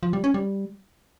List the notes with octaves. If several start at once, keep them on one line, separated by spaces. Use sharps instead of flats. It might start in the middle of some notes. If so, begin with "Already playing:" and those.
F3
G3
C#4
G3